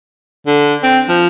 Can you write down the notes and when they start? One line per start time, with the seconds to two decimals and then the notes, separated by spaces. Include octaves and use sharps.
0.47 D3
0.83 C4
1.08 F3